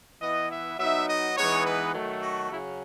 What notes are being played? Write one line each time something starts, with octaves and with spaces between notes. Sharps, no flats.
E3 B3 E4 D#5
E5
F#3 B3 D#4 E5
D#5
E3 G#3 B3 D#4 C#5
B4
D#3 F#3 A3
F#4
C#3 F#3 C#4 E4